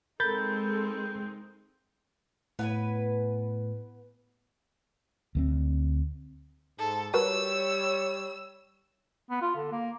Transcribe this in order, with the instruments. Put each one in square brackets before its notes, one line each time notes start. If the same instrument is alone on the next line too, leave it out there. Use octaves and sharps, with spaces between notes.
[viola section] G#3 C4 D#4 [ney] A4 [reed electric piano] A#4 B5 A6 [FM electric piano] G6
[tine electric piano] A2 [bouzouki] B3 B4 G#5
[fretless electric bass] D2 A3 C4
[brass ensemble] G#2 [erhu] A4
[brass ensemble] G3 C#5 [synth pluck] F#4 A#4 B4 [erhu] E6
[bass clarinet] B3
F4
D3
A#3